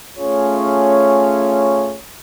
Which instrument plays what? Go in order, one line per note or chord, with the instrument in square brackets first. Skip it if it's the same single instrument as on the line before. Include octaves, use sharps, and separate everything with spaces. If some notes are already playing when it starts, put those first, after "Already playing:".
[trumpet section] A3 C#4 F4 G#4 C#5